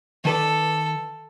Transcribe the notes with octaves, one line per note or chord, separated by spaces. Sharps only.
D#3 A4 B4 D5